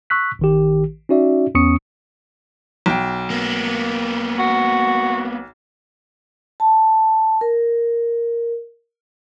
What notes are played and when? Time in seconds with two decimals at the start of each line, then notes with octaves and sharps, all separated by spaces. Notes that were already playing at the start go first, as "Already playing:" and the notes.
0.10 C#6 E6 F#6 B6
0.39 A1 D#3 G4
1.09 C#4 D#4 F#4 D5 E5
1.55 E2 B3 C#4 C#6 D#6 C#7
2.86 B1 G5
3.30 A#3 B3
4.39 F#4
6.60 A5
7.41 A#4